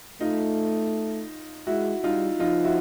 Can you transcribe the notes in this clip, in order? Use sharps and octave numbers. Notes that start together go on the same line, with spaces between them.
A3 D#4 F4
G#3 E4 F#4
G3 D#4 F4
F3 D#4 F4
E4 F#4